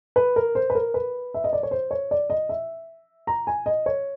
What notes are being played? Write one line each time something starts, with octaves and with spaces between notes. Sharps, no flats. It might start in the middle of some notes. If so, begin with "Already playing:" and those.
B4
A#4
C5
B4
A#4
B4
E5
D#5
D5
C#5
C5
C#5
D5
D#5
E5
A#5
G#5
D#5
C#5